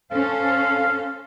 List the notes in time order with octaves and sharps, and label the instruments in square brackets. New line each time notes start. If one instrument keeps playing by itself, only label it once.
[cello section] C#4 A4 C5 [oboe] F5